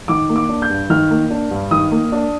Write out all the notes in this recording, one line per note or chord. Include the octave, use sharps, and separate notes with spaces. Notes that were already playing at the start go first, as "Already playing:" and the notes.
D#3 D6
A#3
D6
D4
G6
G2
D#3 F6
A#3
D4
G2
D#3 D#6
A#3
D4